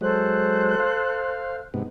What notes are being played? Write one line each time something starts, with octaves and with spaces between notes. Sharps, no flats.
F#3 G#3 A4 C5 F#6
F5
G#2 C3 B3